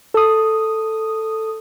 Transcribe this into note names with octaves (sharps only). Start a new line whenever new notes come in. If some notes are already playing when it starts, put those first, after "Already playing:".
A4 D#6